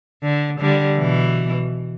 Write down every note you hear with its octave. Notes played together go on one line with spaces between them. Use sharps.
D3
D3 G3
B2 E3